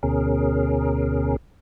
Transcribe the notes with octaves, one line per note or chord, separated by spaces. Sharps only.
D2 B2 C#4 G#4 A#4